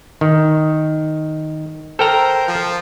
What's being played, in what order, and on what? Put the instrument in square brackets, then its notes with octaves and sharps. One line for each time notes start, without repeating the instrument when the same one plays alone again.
[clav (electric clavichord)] D#3
[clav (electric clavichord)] A4 G5 A#5 [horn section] A#4 C5
[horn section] F3